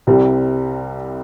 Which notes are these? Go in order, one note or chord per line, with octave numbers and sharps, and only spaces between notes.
C2 C3 G3 C4